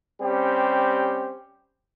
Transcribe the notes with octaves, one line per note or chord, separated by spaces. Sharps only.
G3 C4 C#4 G4